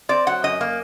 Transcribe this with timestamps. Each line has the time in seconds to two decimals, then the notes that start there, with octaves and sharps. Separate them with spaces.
0.09 C4 D5
0.26 F#3 F#5
0.43 F#2 D#5
0.61 A#3